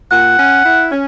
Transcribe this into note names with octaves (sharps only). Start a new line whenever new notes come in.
A#2 F#5
C#4
E4
C#4